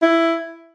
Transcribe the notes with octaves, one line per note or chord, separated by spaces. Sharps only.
E4